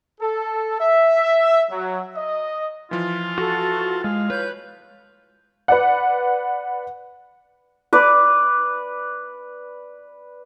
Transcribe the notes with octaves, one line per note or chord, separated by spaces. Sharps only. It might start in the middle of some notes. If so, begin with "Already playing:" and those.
A4
E5
F#3
D#5
E3 F3 F4
F#4 A4
G#3 F5
B4 C#5 G6
B4 D5 F#5
B4 D5